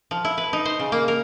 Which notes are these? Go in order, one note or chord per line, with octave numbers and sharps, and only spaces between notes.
F3
E4
B4
D#4
C5
C#3
A#3
A#4